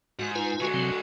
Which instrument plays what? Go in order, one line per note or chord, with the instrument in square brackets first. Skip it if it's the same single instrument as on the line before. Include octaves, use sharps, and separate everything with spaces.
[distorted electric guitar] G#2 [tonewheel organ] F#4
[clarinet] D#4 [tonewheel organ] F4 B4 G#5
[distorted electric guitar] D3 G#3 [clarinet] F#4
[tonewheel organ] C3 F#3 C4